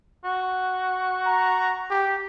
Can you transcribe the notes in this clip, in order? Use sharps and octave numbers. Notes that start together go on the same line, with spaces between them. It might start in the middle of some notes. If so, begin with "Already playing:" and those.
F#4
A#5
G4